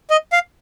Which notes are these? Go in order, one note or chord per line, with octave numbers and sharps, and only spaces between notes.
D#5
F5